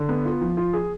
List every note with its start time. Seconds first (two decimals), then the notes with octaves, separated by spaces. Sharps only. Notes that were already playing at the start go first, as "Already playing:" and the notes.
Already playing: D3
0.09 B3
0.25 F4
0.41 F3
0.57 F4
0.73 G#4